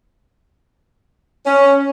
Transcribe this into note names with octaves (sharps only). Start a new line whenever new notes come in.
C#4